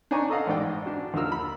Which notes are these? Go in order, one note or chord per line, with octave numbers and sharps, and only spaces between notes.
D4 D#4 C#5 G#5 A#5 C#6
A4 D#5 F5 F#5
A1 G#2 D5 G5
D4 F#4
D#2 D3 F4 A#4 E6 F6
B5